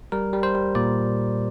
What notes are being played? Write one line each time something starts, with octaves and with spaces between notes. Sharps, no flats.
G3 A#4
G3
C5
G3
A#2 D5